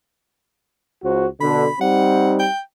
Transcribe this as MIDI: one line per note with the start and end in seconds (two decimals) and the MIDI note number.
1.04 1.27 37
1.04 1.27 66
1.04 1.27 72
1.41 1.68 47
1.41 1.68 50
1.41 1.77 83
1.81 2.47 55
1.81 2.47 60
1.81 2.47 63
1.81 2.33 78
2.39 2.59 79